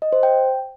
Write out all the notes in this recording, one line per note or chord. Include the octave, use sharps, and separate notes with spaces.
D#5
C5
G5